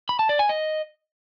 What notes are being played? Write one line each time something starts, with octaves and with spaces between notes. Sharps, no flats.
B5
A5
D5
G#5
D#5